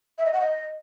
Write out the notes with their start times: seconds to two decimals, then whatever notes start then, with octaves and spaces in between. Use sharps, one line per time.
0.18 E5
0.26 D#5
0.33 F#5
0.41 D#5